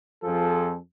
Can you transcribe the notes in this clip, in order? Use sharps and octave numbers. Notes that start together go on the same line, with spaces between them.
F2 F3 G#4 A4